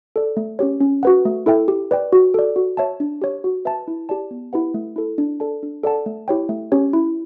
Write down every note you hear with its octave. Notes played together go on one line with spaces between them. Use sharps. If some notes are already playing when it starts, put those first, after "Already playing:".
A4 D5
A3
C#4 G4 C#5
C#4
F#4 B4 F#5
A3
E4 A4 E5 G5
G4
B4 D5 G5
F#4
A4 D5
F#4
C#5 E5 A5
D4
G4 C#5
F#4
B4 E5 A5
E4
G4 D5 A5
B3
E4 G4 B4 F#5
A3
E4 A4
D4
A4 D5 A5
D4
A4 D5 F#5 A5
A3
E4 G4 C#5 G5
A3
C#4 G4 C#5
E4